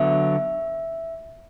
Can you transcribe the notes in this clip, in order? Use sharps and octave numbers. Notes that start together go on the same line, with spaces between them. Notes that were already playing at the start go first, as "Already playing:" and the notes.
Already playing: D3 F#3 B3 E5